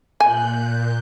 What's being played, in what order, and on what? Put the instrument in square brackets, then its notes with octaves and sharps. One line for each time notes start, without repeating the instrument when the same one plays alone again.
[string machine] A#2 F#6 G6 [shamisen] G#5